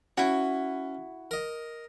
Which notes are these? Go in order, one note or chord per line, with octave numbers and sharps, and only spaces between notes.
C#4 E4 F#4
A#4 D#5